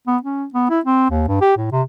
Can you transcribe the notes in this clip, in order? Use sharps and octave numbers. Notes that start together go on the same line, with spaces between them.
B3
C#4
B3
E4
C4
D#2
G2
G4
A2
C3